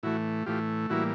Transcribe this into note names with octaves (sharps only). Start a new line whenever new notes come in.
A2 E3 A3 E4 F#4
A2 E3 A3 F4 G4
A2 E3 G3 A#3 E4 F#4